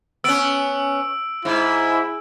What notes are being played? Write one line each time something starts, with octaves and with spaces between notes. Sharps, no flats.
B3 C#4 E6 D7
G#2 E4